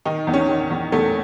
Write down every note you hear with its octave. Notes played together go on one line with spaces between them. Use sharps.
D#3 D#4
E2
C#4
D#3
E2
E2 A3